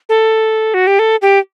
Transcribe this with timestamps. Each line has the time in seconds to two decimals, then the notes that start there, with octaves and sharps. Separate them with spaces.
0.09 A4
0.74 F#4
0.87 G4
0.99 A4
1.22 G4